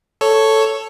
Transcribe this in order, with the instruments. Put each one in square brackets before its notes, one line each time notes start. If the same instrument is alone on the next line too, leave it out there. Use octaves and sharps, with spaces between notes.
[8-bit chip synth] A4 C#5